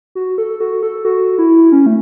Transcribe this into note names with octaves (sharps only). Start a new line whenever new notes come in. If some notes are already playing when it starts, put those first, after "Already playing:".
F#4
A4
F#4
A4
F#4
E4
C#4
A3